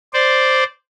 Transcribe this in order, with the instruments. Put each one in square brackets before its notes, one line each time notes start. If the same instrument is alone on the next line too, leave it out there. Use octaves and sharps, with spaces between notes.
[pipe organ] C5 D5